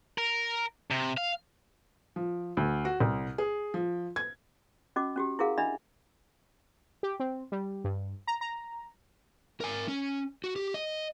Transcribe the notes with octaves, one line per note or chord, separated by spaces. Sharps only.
A#4
C3
F5
F3
D2
F#4
C2
G#4
F3
G#6
C#4 F#4 D#5 D6
C#4 F#4 G4
E4 F#4 G#4 A#4 F5 F#5
D4 E4 D#5 E5 F#5 B5
G4
C4
G3
G2
A#5
A#5
A#4 G#5
C#4
F#4
G4
D#5